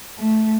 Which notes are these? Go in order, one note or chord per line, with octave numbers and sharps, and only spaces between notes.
A3